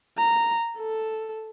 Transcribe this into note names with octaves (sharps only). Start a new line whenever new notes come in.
A#5
A4